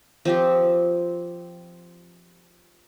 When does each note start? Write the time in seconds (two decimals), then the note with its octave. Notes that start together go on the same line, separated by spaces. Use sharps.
0.25 F3 C4 G4